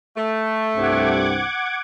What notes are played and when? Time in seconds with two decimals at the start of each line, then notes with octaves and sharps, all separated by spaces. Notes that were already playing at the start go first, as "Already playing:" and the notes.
0.17 A3
0.76 C2 G2 C4 F#5 D6 G#6